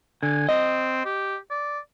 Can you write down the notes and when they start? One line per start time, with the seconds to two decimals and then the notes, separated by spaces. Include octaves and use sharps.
0.23 D3 G#5
0.49 C4 D#5
1.05 G4
1.51 D5